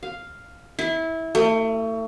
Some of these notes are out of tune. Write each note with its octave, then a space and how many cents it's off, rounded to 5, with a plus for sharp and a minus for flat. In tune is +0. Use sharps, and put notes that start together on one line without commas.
F5 +0
E4 -20
A3 +35